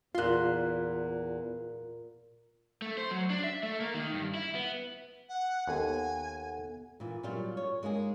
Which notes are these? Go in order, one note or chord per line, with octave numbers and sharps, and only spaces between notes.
E2 A#2 F4 C6 F#6
A3
C5
F#3
D4
E5
A3
A#3
D#3
G2
E4
B3
F#5
D#2 B3 A4 F#5 G#5
A#2 E3
A#2 F#3 G3 F4
C#5
G#3 A#3 D#4 G#4